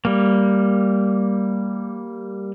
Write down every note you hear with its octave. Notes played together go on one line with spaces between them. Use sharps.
G3 A#3